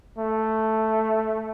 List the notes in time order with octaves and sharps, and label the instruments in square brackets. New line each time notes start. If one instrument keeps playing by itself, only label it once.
[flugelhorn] A3